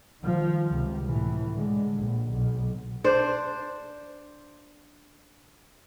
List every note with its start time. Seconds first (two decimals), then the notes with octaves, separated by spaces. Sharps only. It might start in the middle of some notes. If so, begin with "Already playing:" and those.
0.21 D#3 F3
0.69 C#2 C3
1.06 A2 E3
1.55 D3 G#3
1.96 A#1
2.31 B1
3.04 D4 C5